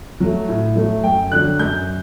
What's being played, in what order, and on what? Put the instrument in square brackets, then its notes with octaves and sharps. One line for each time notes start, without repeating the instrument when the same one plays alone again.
[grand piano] F#3 A3
A2
F#3 A3
F#2 G5
D3 F#3 F#6
F#2 G6